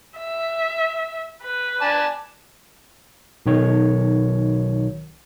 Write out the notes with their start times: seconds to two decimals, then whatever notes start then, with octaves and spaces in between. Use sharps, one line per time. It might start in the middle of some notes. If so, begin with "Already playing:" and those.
0.17 E5
1.43 B4
1.81 D5 G#5 A5
3.46 B1 D#3 C#5